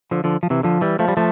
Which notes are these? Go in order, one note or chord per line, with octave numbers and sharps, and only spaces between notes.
D3 F3
D3 F3
F3
C3 E3
D3 F3
E3 G3
F3 A3
G3
F3 A3